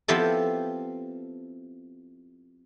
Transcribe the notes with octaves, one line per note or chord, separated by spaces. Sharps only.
F3 B3 C4 E4 G4 A4